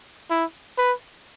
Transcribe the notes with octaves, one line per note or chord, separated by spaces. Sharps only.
E4
B4